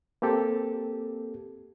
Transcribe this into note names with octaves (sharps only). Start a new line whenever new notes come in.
A#3 C4 G4 A4